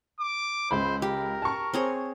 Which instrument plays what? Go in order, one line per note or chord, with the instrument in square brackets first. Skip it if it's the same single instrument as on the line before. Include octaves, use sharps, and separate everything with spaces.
[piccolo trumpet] D6
[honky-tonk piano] C#2 B5 [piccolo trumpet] C5
[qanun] G4 [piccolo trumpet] A#4
[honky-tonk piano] A5 C#6
[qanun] C4 G#4 C#5